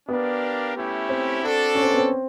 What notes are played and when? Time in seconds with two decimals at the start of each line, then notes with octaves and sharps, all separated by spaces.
0.09 B3 D4 G4 A#4 D5 F5
0.75 A3 C#4 E4 G4
1.09 C4
1.42 D4 F#4 A4 D5
1.75 C#4
1.82 C4
1.91 B3
1.98 C4